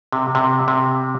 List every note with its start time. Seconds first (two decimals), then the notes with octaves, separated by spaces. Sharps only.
0.12 C3
0.35 C3
0.68 C3